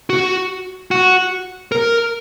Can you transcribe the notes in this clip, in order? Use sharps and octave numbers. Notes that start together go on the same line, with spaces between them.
F#4
F#4
A#4